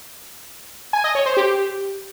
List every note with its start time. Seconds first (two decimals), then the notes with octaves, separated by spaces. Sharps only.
0.93 G#5
1.04 D#5
1.15 C#5
1.26 C5
1.37 G4